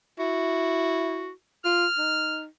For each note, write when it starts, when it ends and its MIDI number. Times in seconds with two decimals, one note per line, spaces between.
0.19 1.30 64
0.19 1.31 66
1.65 1.86 65
1.65 2.41 89
1.98 2.46 63